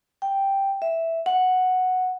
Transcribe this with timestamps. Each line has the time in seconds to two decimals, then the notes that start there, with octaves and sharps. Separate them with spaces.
0.22 G5
0.82 E5
1.26 F#5